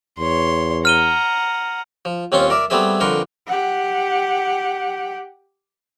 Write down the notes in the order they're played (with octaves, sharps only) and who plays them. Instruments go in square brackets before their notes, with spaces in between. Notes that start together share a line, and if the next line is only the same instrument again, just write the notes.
[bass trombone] E2 [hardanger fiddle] C#5 C6
[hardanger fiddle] F#5 A#5 [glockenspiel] F6 D#7 G7
[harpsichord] F3
D#2 C4 C#4 F4 C6 C#6
A#4 D5 E5
G3 A3 B3 C4 G#4 E5
F2 D3 A#4 B4 C6 C#6
[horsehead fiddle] G4 F#5